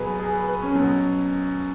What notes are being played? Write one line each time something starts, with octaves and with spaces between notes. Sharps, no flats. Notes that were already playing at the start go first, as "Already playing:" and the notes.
Already playing: B2 F#3 G#4 B4
G#4
B4
B4
C#4
B2 F#3